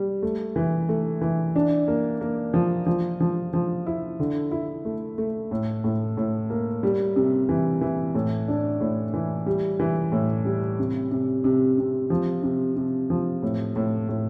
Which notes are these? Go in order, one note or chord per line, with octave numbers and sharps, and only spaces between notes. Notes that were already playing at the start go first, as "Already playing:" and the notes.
Already playing: G3
A3
E3
A3
E3
D4
A#3
A#3
F3
F3
F3
F3
E4
D3
E4
A3
A3
A2
A2
A2
A#3
G3
C3
E3
E3
A2
D4
A2
E3
G3
E3
A2
G3
C3
C3
C3
C3
F3
C3
C3
F3
A2
A2
A2